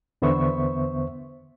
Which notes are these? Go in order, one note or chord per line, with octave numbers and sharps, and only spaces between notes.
E2 D3 B3 C5 E5 C#6